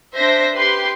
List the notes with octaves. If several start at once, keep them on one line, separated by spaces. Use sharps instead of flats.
D4 C5 E5 A#6
G4 B4 C6